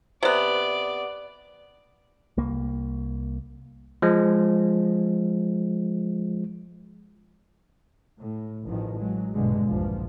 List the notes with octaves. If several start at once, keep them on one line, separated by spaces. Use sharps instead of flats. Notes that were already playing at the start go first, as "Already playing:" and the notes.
C3 B3 D5
C2 A#3
F3 G#3
A2
A1 A2 D#3 F3
F#3 G#3
A#1 G2 B2 D3 G#3 A3
A#1 E2 G2 F3